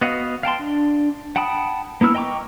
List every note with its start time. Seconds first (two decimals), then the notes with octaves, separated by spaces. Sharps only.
0.01 B3 F#4 D#5 F5
0.43 F5 G5 A5 C6
0.59 D4
1.36 F#5 G5 A5 B5 D#6
2.01 A#3 B3 E4 E6 F6
2.15 D#5 G5 A#5 C#6 D6